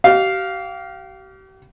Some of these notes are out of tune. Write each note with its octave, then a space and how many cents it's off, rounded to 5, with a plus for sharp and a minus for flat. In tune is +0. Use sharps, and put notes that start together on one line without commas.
G4 -40 F5 +0